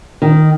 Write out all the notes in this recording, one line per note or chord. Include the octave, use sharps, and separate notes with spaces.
D#3